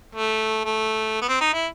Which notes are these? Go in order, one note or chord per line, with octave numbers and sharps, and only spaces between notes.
A3
A3
B3
C4
D#4
E4